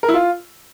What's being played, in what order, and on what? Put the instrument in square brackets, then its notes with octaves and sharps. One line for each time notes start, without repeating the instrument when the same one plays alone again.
[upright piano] A#4
E4
F4